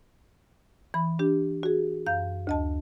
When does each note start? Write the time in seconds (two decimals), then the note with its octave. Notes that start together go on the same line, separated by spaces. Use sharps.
0.94 E3 B5
1.19 D4 G4
1.63 F#4 G#4
2.07 F#2 F5 G6
2.47 D2 D#5 A5